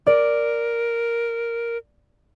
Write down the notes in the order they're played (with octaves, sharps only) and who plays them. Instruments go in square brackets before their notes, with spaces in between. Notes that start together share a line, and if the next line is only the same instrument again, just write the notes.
[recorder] A#4 [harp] D5